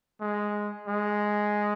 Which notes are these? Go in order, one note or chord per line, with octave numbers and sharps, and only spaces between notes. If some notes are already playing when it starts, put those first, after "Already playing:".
G#3
G#3